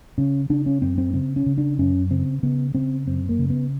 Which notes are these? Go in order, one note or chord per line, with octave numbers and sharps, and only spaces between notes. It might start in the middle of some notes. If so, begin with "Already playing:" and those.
C#3 C#4
C#3 D4
C#4
F#2 C4
C4
C#3 C4
C#4
C#3
D4
F#2 C#4
C#3 C4
C#3 B3
C#3 C4
F#2 C4
A#3
C#3
B3